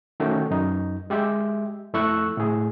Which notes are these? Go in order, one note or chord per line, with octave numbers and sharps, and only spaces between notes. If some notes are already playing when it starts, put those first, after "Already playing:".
D#3 A3 C#4 F#4 G5
F#2 D#4
G#3 G4 E5
F2 A3 E4 C#6 E6 F#6
A2 G#4